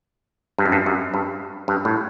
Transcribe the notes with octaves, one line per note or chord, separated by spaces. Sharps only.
G2
F#2
G2
F#2
G2
G2
A2